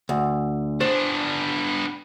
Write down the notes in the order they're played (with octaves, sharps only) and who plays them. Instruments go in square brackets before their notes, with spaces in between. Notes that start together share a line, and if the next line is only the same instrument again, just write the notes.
[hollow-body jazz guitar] D2
[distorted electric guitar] B3 D4 [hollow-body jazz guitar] C5